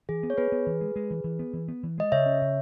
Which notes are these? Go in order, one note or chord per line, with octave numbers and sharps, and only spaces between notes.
E3 G#4
B3
C#5
B3 G#4 B4
B3
E3
G#3
G#3
E3
E3
B3
E3
B3
E3
G#3 D#5
C#3 C#5 E5
C#4
C#3